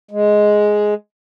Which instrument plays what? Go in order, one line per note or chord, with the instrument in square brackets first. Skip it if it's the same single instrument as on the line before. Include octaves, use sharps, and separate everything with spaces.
[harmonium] G#3